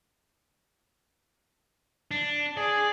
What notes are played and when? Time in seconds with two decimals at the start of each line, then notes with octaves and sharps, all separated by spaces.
2.11 D4
2.57 G#4 D5